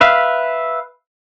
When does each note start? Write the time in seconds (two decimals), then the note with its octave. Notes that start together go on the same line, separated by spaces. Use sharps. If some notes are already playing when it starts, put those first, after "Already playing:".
0.01 B4 E5 F5